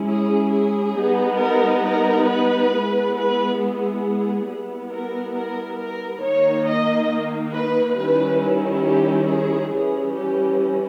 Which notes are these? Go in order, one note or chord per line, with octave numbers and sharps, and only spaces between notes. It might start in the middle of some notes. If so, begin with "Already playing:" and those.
Already playing: G#3 C#4 E4
G#4
G#4
G3 B3 D#4
A#4
A#4
B4
G#3 B3 E4
B4
G#4
G#4
G3 B3 E4
A#4
A#4
A#4
D#3 A#3 D#4 C#5
D#5
B4
D#3 G3 C#4 E4 B4
G4
G#4
E3 G3 C#4 E4 G#4
G4